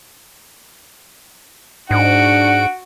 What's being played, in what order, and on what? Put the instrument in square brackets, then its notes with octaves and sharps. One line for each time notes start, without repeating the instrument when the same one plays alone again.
[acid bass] G#2 [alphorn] D4 [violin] F#4 D7 [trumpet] F#5